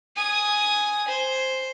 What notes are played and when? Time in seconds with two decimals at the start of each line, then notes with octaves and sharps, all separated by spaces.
0.16 G#5 D#6
1.08 C5